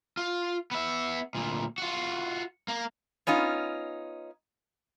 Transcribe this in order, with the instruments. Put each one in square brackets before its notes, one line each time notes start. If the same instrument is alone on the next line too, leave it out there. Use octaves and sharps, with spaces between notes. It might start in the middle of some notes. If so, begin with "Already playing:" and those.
[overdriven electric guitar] F4
B3 E5
D2 A#2
F4 F#4
A#3
[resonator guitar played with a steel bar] B3 C#4 D#4 F4